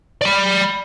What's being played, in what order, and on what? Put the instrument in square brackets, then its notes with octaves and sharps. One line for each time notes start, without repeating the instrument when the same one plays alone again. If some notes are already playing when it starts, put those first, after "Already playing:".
[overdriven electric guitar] D5 B5